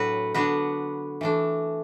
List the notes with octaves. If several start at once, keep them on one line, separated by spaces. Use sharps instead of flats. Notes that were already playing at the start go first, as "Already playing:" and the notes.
Already playing: A2 F#3 D4 F#4 A4 B4
D3 B3 D4 F#4 B4
E3 A3 D4